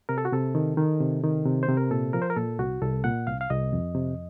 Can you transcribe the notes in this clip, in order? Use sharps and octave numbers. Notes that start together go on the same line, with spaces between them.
C3 A#4
A4
F#4
C3 A4
D#3
D#3
C3
D#3
C3
C5
C3
A#4
A#2 A4
F3 A#4
C5
A#4
A#2 A4
C2 F#4
C2 A4
A#2 F#5
C2 F5
F5
C2 D#5
F2
C3